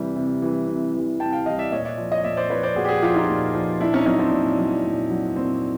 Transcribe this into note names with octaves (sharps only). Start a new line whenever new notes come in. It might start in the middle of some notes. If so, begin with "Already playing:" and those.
Already playing: C3 E3 G3
C3
E3 G3
C3
E3 G3
C3 G5 A5
F5 G5
E3 G3 D#5 F5
D5 E5
A#2 C#5 D#5
D5 E5
F3
C#5 D#5
A#2 D5 E5
C5 D5
F3 B4 C#5
C5 D5
A#2 F#4 G#4
G4
F#4 G#4
F3 F4 G4
D#4 F4
A#2
F3
A#2 D4 E4
C#4 D#4
F#3 C#4 D#4
C4 D4
A#2
F#3
A#2
F#3
A#2 C4